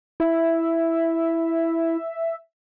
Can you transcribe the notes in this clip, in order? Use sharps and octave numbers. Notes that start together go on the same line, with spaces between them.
E4 E5